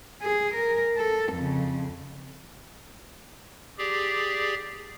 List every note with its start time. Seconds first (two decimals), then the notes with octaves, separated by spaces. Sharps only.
0.22 G#4
0.55 A#4
0.97 A4
1.33 F2 C#3
3.78 G4 G#4 D5